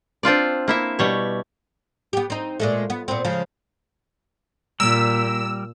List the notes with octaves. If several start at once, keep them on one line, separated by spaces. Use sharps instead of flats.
C4 D4 F4 D5
A#3 E4 E5
B2 G3 C#5
B3 G4
C4 D#4
A#2 G#3 A3
B3
A#2 B3 C4
C#3 F3 G#3
A#2 G3 A#4 E6